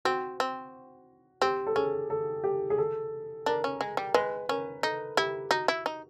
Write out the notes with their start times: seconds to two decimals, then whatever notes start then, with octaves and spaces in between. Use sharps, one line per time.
0.05 C4 F#4
0.40 C4
1.42 C4 G4
1.67 A4
1.76 C#4 G#4
2.10 A4
2.44 G4
2.70 G#4
2.78 A4
3.46 D4 A#4
3.64 C#4
3.81 G#3
3.97 G3
4.14 G#3 B4
4.49 C#4 A#4
4.83 D#4 A4
5.17 E4 G4
5.51 D#4 F#4
5.68 E4
5.86 D#4